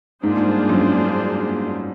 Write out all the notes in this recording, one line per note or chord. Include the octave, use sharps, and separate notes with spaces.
G#2 A#3 D4 F4 G#4 C5
G#2
G2
F#2
F#2